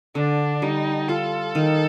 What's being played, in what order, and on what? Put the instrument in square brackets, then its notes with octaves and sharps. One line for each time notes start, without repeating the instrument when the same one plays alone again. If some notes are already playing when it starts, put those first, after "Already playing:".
[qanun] D3 [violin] D4
[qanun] G3 [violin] D#4
[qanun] F4 [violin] A4
[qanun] D#3